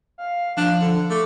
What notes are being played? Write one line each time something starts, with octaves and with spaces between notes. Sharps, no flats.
F5
F3 D4
D3
A3 D6